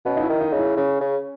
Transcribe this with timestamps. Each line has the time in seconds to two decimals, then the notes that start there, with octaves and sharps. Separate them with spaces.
0.05 B2 C#4
0.17 D#4
0.22 E4
0.29 D#3
0.41 D#4
0.53 C#3
0.59 E4
0.77 C#3 C#4
1.01 C#3